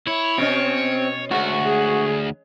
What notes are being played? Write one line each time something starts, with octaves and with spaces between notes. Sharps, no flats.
E4 C#5
B2 C4 C#4 D#5
D2 G#3 F#4
G#4